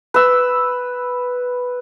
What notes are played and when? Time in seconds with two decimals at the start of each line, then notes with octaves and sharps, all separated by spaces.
0.14 B4 E6